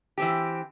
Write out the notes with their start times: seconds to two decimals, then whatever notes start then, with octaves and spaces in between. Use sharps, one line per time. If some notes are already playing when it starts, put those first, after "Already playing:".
0.18 E3 C4 G4